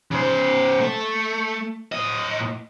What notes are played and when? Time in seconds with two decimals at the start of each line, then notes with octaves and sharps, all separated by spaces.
0.11 C#3 C5
0.80 A3
1.92 A2 D#5